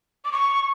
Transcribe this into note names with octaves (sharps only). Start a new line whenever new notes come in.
D6
C#6